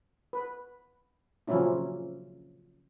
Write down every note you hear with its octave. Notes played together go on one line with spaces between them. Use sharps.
B4
C#3 F3 F#3 A#3 C#4 E4